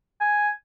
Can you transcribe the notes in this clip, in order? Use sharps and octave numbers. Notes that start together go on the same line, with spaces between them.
G#5